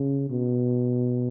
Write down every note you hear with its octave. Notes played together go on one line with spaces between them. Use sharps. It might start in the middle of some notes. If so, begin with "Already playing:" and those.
Already playing: C#3
B2